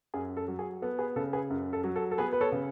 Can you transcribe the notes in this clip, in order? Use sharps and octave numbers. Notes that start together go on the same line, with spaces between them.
F#2 G#4
A4
F#3
G#4
B3 A4
G#4 B4
C#3 A4
G#4 B4
F#2
A4
F#3
A4
A4
B3 G#4 B4
B4
A4 C#5
C#3